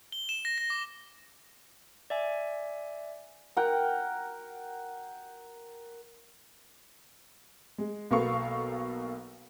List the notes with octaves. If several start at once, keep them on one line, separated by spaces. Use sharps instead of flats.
G7
E7
A#6
A#6
D6
D5 E5 G#5
A#4 F#5 G5
G#3
B1 A#3 B3 A4 F5 C#6